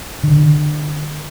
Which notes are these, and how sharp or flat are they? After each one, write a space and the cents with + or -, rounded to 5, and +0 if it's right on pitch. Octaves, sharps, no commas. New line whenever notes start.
D3 +35